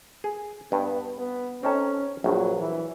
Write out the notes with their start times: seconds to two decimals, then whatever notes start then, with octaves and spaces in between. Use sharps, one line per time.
0.24 G#4
0.72 G2 B3
1.18 B3
1.63 C4 C#4 D#4 A4
2.24 A#1 G2 F#3
2.60 E3